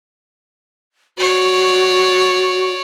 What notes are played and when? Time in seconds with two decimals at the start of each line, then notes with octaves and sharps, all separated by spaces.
1.18 F#4 C#5 D5